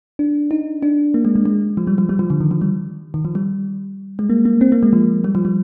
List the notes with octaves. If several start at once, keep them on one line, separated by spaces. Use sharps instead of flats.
D4
D#4
D4
A#3
G#3
G#3
G#3
F3
G3
F3
G3
F3
D3
D#3
F3
G3
D#3
F3
G3
G#3
A#3
A#3
C4
A#3
G#3
F3
G3
F3
G3